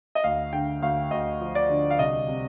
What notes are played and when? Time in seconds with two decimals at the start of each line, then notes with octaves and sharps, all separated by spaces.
0.15 D#5
0.24 D2 F5
0.53 D3 G5
0.82 D2 F5
1.11 D2 D#5
1.41 F3
1.55 D5
1.69 D3
1.90 F5
1.99 C2 D#5
2.28 C3